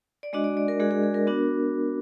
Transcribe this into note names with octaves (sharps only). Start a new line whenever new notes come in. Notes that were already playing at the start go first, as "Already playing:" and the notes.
D5
G#3 D4 F#4 D#5
D5
D5
A#4
G#3 D4 F#4 G#4
G#4
G#4
A#4
B3 D4 F#4